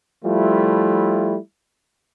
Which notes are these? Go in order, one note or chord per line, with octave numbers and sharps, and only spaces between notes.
F3 G3 A3 E4 F4